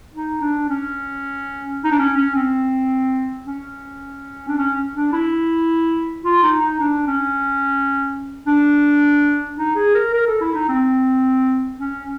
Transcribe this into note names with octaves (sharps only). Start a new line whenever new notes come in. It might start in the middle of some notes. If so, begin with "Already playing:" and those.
D#4
D4
C#4
D#4
D4
C#4
C#4
C4
C#4
D4
C#4
D4
E4
F4
D#4
D#4
D4
C#4
D4
D#4
G#4
A#4
A#4
A4
E4
D#4
C4
C#4